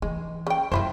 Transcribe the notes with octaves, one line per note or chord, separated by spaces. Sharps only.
E3 G#3
C#3 G5
F#2 F3 E4 C5